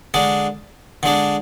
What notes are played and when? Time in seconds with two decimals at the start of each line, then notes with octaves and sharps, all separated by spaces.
0.14 D3 G#3 D4
1.03 D3 G#3 D4